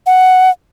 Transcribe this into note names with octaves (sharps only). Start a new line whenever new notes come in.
F#5